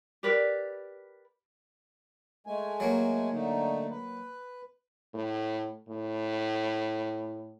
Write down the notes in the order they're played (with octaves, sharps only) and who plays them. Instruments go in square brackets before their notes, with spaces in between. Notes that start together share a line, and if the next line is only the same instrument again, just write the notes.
[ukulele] G4 A#4 B4 D5
[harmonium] G#3 A3 G#5
[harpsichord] F#3 A#3
[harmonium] D3 A3 D#4
B4
[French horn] A2
A2